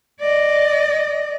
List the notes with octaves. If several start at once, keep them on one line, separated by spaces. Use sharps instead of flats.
D5 D#5